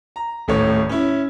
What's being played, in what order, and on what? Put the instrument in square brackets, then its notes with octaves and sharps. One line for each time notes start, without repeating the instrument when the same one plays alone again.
[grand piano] A#5
D#1 A2 A3 C#5
C#4 E4